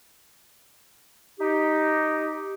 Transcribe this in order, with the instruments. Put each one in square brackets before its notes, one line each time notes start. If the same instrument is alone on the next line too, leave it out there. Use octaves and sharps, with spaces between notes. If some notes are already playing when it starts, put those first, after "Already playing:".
[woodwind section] D#4 G4